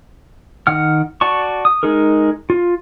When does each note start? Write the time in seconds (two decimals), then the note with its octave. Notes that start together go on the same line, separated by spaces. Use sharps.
0.67 D#3 F#5 F6
1.21 F#4 D5 A5 C#6
1.65 D#6
1.83 G#3 D#4 G#4 A#4
2.50 F4